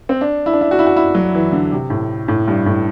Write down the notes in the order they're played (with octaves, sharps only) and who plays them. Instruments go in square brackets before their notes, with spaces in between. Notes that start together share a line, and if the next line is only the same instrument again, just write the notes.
[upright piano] C4
D4
E4
D4
E4
F#4
E4
F#4
E4
F#3
E3
D3
C3
A2
A2
G2
A2